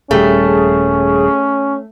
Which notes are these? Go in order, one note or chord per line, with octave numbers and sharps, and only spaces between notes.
D#1 G3 A3 C#4 G#4